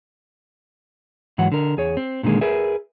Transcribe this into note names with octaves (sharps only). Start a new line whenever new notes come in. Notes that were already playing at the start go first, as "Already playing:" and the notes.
G#2 E3 F#3 F#5
D3 A#4
E2 G#4 C#5
C4
A#2 D3 D#3 G#3 A#3
G#4 A#4 B4 E5